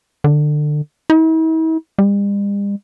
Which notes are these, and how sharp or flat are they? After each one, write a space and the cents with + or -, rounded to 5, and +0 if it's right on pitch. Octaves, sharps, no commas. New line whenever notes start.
D3 +25
E4 -45
G3 +45